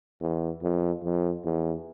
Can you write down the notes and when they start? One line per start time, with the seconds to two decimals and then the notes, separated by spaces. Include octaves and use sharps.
0.21 E2
0.62 F2
1.04 F2
1.45 E2